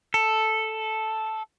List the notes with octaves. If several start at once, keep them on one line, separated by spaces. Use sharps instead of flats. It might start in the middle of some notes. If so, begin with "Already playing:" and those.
A4